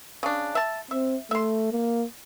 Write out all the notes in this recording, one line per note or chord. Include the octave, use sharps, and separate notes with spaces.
C#3 D4
E5 A5
C4 E5
A3 E5 C6
A#3